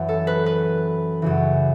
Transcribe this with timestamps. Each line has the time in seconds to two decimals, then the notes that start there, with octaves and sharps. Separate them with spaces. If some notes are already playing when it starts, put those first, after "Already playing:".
Already playing: F#2 E3
0.09 A4
0.27 B4
0.46 B4
1.22 F#2 C#3 E3